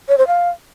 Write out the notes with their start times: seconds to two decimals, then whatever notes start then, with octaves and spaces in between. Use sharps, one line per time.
0.08 C#5
0.18 C5
0.27 F5